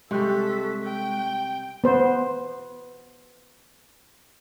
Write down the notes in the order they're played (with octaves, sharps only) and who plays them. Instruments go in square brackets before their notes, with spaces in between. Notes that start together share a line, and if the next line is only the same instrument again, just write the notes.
[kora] C3 G3 [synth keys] G#3 C#6 F#6 [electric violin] A4 B6
[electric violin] G5
[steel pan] B3 C5